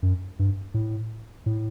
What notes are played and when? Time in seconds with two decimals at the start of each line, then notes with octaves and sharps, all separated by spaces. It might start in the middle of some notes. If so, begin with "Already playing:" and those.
0.03 F#2
0.39 G2
0.74 A2
1.46 A2